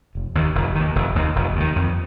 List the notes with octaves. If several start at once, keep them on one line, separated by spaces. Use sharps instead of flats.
F1
D#2 D#3
F1
D#2 D#3
F1
D#2 D#3
F1
D#2 D#3
F2